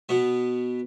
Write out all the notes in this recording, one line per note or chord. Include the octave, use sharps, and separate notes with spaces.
B2 B3